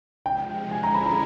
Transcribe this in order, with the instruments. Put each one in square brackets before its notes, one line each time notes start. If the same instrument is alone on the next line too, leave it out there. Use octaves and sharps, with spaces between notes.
[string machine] C3 F3 G#3 [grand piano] G5
[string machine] D3 F3 G#3 C#4 E4 [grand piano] G#5
[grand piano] A#5
B5
A#5